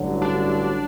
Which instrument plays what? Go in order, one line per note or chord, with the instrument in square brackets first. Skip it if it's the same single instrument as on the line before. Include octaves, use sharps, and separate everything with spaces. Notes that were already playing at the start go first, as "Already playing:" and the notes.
Already playing: [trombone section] A1 G2 D3 F#3
[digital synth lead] D4